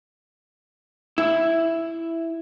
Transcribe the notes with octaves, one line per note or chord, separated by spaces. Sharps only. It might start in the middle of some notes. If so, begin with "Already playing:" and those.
E4